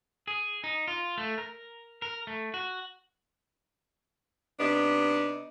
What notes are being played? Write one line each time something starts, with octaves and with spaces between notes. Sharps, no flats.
G#4
D#4
F4
A3
A#4
A#4
A3
F#4
C3 B3 D4 D#4